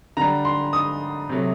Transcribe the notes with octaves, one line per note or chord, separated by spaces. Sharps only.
D3 G3 A#5
C6
D#6
C3 F#3 A3